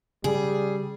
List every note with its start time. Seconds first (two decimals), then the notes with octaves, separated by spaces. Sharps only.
0.24 C#3 G3 G#4